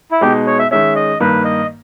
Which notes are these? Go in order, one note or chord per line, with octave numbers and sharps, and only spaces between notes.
E4
B2 G#3 D#4 G4
C#5
E5
D#3 G#3 C#4 E5
D#5
G2 D#3 A#3 B4
D#5